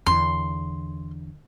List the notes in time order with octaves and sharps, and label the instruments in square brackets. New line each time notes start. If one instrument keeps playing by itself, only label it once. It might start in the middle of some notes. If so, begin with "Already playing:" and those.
[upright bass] E2 D3 [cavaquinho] C6